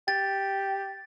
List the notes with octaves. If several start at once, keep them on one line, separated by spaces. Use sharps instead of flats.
G4 A6